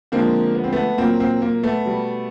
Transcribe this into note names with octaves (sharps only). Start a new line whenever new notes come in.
D3 F3 G#3 A#3 C4
B3
C4
A3 B3
A#2 F#3 A#3 C4
A#3 C4
A#3
A3 B3
B2 G3